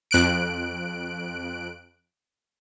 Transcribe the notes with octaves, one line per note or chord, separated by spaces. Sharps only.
F2 F#6 D7